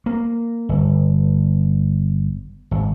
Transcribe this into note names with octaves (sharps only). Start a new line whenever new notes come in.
A#3
G1
G#1